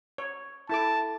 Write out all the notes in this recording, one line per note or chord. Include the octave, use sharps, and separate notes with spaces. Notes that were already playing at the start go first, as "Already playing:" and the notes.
C#5
E4 A4 A5 D6